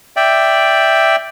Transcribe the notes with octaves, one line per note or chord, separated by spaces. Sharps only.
D5 E5 G5